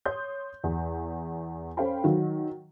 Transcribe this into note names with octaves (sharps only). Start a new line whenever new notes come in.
C#5 C6 D#6 G6
E2
C#4 A4 C5 F5 G5 B5
D#3 F#3